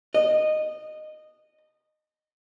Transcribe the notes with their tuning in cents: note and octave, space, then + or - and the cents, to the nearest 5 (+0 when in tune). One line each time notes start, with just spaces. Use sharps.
D#5 -15